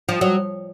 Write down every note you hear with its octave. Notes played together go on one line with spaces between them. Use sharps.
F3
F#3